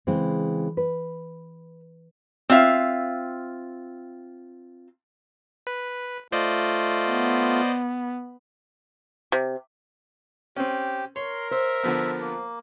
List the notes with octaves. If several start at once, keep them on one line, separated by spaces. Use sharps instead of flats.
C#3 E3 G#3 C4
B4
C4 F4 E5 F5
B4
A3 F4 C5 D5 D#5
B3
C3
C4 C#4 G4
A#4 C#5 C6
C5 E5
D3 F3 B3
A#3